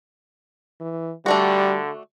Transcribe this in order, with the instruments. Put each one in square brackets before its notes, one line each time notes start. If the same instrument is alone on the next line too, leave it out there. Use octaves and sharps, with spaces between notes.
[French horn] E3
[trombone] D3 [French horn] G3 [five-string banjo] A3 D4 F#4